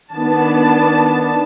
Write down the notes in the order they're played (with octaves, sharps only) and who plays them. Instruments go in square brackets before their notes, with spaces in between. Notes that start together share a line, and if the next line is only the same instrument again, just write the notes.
[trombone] D#3 [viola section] B3 D4 A5